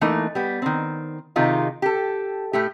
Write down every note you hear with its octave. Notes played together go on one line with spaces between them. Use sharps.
E3 A3 A#3 D#4
G3 B3
D#3 C4
C3 D#3 D#4 F4 G#4
G4 A4
A2 A3 G4